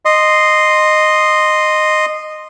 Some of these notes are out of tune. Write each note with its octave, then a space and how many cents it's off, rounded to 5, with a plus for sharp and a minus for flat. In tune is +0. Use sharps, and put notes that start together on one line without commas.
D#5 -10 C6 +0